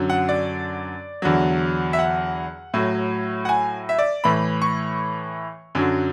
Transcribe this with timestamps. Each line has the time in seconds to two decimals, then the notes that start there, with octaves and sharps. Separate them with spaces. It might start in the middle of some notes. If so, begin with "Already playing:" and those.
Already playing: F#2 D3 F#3
0.10 F#5
0.29 D5
1.22 E2 D3 F#3
1.93 E5
1.99 F#5
2.74 A2 F#3
3.45 F#5
3.49 G#5
3.89 E5
3.99 D5
4.24 A2 E3 B5
4.62 C#6
5.75 F#2 D3 F#3